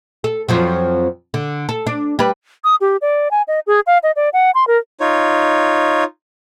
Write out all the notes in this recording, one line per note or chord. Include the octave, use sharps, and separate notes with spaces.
A4
F2 F3 F#3
D3
A4
D4
G3 B4
D#6
G4
D5
G#5
D#5
G#4
F5
D#5
D5
F#5
C6
A#4
D#4 F4 C#5